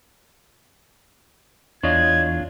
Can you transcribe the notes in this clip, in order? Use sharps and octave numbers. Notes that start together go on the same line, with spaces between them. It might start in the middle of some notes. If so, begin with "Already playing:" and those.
E2 D4 F4 C#5 D#5 G#6